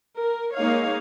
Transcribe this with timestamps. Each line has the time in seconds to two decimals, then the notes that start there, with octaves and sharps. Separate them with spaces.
0.18 A#4
0.54 G#3 A#3 D#4 C#5 F5